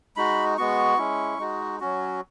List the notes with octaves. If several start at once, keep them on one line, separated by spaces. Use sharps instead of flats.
G#3 D#4 F#4 B5
G#3 B3 F#4 C#6
G#3 C#4 E4
G#3 D#4 F#4
F#3 C#4 F#4